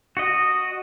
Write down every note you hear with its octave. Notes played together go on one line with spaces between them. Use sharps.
F#4 D#5